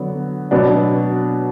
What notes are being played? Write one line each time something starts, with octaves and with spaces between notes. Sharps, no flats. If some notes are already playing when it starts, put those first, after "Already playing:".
Already playing: D3 F#3 B3
B2 F#3 B3 D4